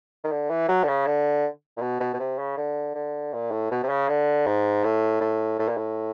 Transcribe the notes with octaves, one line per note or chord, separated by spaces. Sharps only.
D#3
D3
E3
F#3
D3
C#3
D3
A#2
B2
B2
B2
C3
C#3
D3
D3
A#2
A2
B2
C3
C#3
D3
G#2
A2
A2
A2
A#2
A2